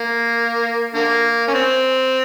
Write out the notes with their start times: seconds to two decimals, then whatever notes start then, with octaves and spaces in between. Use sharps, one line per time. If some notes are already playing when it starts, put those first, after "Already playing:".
Already playing: A#3
0.94 D3 A#3
1.48 C#4
1.54 C4